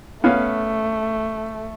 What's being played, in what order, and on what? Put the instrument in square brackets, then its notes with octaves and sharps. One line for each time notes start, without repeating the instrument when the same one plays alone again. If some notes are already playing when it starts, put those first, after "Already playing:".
[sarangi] A3 [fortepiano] B3 C#4 F5